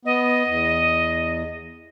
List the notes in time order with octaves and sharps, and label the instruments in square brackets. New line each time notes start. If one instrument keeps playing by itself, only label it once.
[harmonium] B3 [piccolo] D#5
[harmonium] E2